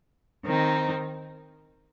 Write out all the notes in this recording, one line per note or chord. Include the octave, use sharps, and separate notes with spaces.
D#3 C4 D#4